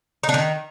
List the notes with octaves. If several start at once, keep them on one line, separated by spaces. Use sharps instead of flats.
D#4
D4
D#3